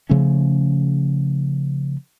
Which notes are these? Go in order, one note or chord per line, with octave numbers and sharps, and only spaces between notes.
C#3 F3 A3 C#4